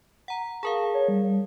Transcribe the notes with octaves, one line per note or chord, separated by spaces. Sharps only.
F#5 A#5
G#4 A#4 F5 A5
C#5
G3